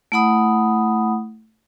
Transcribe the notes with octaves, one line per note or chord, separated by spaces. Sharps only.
A3 E4 F#5 B5 D#6